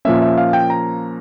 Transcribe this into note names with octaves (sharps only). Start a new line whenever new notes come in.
A#2 F3 A#3 C#4 E5
E5
F5
G5
A#5